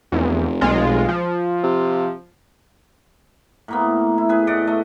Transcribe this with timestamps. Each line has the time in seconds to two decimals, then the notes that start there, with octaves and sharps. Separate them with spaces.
0.12 F1 E2
0.61 B1 G#3 F4
1.09 F3
1.63 C3
3.68 A2 A#3 B3
4.18 E4
4.29 G#4 B4 G#5
4.47 A2 D5 D#5 F#5
4.67 A3 D#5